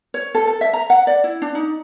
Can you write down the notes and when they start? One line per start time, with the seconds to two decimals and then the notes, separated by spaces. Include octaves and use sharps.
0.14 C#5
0.35 A4
0.47 A4
0.61 E5
0.73 A#5
0.90 F#5
1.07 D5
1.24 E4
1.42 D4
1.55 D#4